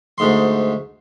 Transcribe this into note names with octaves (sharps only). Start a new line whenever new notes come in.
D2 G#2 C6